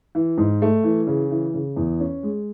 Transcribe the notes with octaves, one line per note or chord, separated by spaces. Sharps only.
E3
G#2
A3
E3
C#3
E3
C#3
E2
C#4
G#3